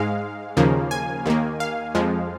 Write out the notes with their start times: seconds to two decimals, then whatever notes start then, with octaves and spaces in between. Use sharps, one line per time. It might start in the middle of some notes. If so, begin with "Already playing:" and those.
Already playing: G#2 G#3 F5
0.57 D#2 C#3 F3 A#3
0.91 G#5
1.26 D#2 D#3 A#3
1.60 F5
1.95 F2 F3 G#3